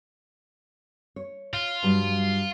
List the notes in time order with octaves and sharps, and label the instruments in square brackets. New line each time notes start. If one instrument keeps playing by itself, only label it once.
[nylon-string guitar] C#5
[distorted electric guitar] F4
[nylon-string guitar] G2 F#3 G3